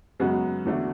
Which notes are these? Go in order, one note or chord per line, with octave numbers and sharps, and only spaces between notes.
F#2 C#3 G#3 B3 F#4
E2 D3 A3 D4 F#4